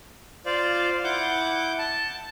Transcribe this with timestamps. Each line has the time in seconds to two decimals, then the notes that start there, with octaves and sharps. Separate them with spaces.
0.46 F4 C5 D5 F5
1.04 E4 F#5 D6 G6
1.79 A5